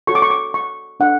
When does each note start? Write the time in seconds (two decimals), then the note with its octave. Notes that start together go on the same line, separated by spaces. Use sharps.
0.07 F#4 A4 C#5 C#6
0.15 D6
0.22 C#6
0.30 D6
0.54 C#6
1.00 D4 A4 F#5